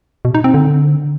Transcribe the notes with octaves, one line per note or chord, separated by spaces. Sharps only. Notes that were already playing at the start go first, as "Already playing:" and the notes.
B2
D#4
C4
D3